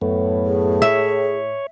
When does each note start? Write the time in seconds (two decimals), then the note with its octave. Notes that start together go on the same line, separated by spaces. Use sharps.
0.02 F#2 A2 A3 B3
0.45 G#4
0.82 C#5 E5